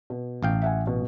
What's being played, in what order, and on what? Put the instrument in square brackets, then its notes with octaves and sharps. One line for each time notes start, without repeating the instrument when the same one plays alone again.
[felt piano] B2
[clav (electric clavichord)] A1 F5 G5
[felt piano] E5 F#5 G#5
B2